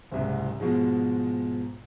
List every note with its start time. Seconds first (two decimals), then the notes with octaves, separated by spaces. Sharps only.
0.11 F#1 C2 G#2
0.60 G#2 B2 F3 G#3